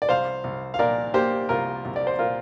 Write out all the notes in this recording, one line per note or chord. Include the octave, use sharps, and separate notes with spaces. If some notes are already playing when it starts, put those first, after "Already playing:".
D5
C2 C5 F5
C2
F5
A#2 A#4 D5
A#3 G4 C5
C2 F4 A#4
C2
D5
C5
A#2 F4 A#4